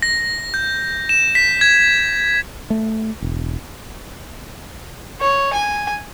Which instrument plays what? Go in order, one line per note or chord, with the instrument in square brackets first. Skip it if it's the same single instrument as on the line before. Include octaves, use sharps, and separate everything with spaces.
[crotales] A#6
G6
E7
B6
G#6
[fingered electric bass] A3
E1
[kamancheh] C#5
G#5